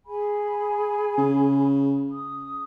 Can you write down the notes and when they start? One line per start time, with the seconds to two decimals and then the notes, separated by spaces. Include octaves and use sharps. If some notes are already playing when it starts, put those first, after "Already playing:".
0.06 G#4 G#5 B5
1.18 C#3
2.10 D#6